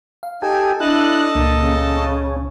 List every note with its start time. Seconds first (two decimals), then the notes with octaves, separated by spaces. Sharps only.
0.23 F5
0.42 D#4 G4 A4 G#5
0.80 D4 E4 A4 D#5 A5 F#6
1.35 C#2 A#2 A#3
1.58 C#3
1.97 C#4